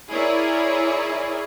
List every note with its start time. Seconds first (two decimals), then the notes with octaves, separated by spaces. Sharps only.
0.10 E4 G#4 A#4 C#5 D5